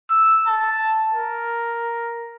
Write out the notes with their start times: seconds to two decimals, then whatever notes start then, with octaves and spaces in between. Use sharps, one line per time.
0.11 E6
0.47 A5
1.13 A#4